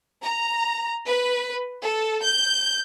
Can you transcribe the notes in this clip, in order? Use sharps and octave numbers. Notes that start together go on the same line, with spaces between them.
A#5
B4
A4
G6